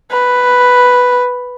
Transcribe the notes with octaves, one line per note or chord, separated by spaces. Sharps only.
B4